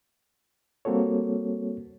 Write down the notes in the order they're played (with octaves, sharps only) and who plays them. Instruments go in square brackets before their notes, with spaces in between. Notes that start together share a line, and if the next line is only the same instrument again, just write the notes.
[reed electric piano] G3 A#3 C4 F#4 A4 C#5